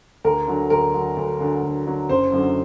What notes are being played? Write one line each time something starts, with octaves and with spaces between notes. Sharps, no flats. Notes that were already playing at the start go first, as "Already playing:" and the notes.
D2 A#4
D3 F#3
D2 A#4
D3 F#3
D2
D3 F#3
D2
D3 F#3
F#1 C5
F#2 D3 F#3